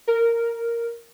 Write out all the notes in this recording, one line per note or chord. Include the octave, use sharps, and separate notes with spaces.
A#4